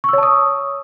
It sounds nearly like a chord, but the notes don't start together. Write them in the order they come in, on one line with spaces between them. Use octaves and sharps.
C#6 E6 C#5 A5 D#6